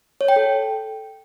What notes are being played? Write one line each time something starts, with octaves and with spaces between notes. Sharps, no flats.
C#5
G5
A4